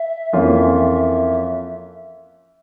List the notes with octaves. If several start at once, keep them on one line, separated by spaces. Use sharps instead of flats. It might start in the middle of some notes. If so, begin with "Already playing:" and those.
Already playing: E5
F2 E3 A#3 C#4 F4